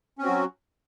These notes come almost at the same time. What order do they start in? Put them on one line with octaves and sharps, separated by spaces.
C#4 C4 F#4 F#3